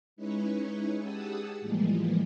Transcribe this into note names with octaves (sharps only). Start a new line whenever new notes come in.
G#3 C#4 D#4 E4 B4 C#5
G4 G#4 F#5 A5 D#6 E6
A2 E3 F3 G3 G#3 A#3